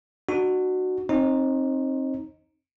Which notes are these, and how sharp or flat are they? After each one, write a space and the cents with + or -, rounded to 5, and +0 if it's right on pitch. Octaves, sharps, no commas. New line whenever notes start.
D4 +40 F#4 +0
C4 +25 D#4 +0 C5 +40